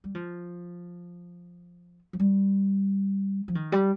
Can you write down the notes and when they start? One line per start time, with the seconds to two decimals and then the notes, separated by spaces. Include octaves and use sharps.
0.04 G3
0.15 F3
2.13 F3
2.20 G3
3.48 F3
3.55 D#3
3.72 G3